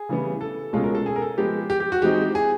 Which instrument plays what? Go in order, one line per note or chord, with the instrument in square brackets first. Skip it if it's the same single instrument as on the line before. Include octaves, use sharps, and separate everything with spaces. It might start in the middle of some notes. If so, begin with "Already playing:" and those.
Already playing: [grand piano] G#4
[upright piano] C#3 E3 G3 B3
[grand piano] A4
[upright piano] C#2 B2 G#3 C#4 F4 [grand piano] A4
[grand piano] A#4
A4
G#4
A#4
A4
[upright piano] F3 G#3 B3 [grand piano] G4
[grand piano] G4
G4
F#4
[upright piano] E3 G#3 C4 D#4 F#4 [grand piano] G4
[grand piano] G#4